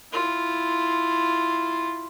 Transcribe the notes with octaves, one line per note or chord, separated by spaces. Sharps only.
E4 F4